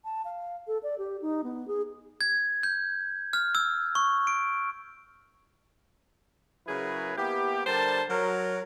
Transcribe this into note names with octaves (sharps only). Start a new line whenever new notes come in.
A5
F5
A4
D5
G4
D#4
B3
G#4
G#6
G6
F6
E6
C#6
D7
C#3 F#3 E4 G#4 A#4 B4
A#3 B3 E4 G4
D3 G3 A#4 C5 A5
F#3 A#4